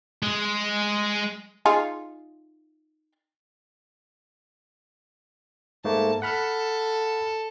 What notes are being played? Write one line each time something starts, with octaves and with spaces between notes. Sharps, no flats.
G#3
D#4 F4 G#4
G#2 A3 A#3 A5
A4 F#5 B5 F6